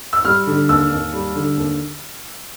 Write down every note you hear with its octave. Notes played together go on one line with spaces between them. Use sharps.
E6
G3 F6
D3
D#2 E6
D#2
G3
D3
D#2